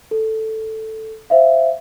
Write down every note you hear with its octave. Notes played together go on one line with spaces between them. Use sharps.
A4
C5 E5 F5